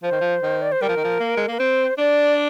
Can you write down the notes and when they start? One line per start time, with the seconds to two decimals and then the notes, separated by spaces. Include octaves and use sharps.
0.03 F3 C5
0.12 D#3
0.20 F3
0.43 D#3
0.62 D5
0.72 C5
0.81 G3 A#4
0.89 F3
0.96 D#3
1.04 F3
1.20 A#3
1.37 G#3
1.48 A#3 A#4
1.59 C4 C5
1.98 D4 D5